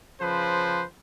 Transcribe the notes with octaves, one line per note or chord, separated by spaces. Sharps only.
C#3 F3 B4 C5